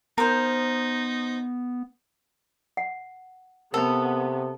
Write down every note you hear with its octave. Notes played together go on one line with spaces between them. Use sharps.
B3 D#4 A#4 C5
F#5
C3 B3 A4 A#4 B5